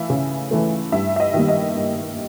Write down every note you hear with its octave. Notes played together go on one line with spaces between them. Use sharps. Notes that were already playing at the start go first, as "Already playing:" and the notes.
Already playing: E3 A3 E5 F5
C#3
E3 A3
G2 E5
E5
D#5
D#3 G3 A#3
D#5
G2